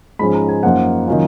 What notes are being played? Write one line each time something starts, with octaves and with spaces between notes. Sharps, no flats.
G#2 F3 G#3 C#4 B5
A#5
G#5
F#2 F3 A#3 D#4 F#5
D#3 F#3 A#3 C#4 F4